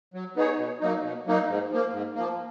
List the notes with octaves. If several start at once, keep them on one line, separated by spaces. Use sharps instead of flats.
F#3
B3 D#4 G#4 C#5
B2
F#3 A#3 D#4
B2
F#3 A#3 D#4
G#2
F3 A#3
G#2
F3 A#3